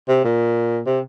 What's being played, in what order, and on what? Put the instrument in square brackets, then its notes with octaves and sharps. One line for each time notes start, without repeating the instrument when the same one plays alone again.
[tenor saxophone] C3
A#2
C3